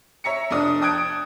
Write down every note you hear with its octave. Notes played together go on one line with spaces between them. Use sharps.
C#5 E5 A#5 C#7
F1 D4 D#6
G5 A5 D#6 F#6 G#6 D7